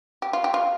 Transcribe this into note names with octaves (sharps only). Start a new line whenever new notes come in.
G4
F4
G4
F4